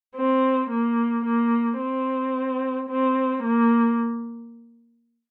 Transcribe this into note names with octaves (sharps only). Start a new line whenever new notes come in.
C4
A#3
A#3
C4
C4
A#3